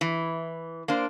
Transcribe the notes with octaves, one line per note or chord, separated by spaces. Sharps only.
E3
A#3 D4 C5